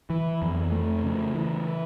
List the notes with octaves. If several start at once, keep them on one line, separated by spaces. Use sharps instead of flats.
E3
F2
A3
C#3
E3